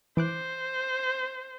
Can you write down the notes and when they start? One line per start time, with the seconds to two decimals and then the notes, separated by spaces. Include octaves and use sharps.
0.17 E3 C5 D6 F#6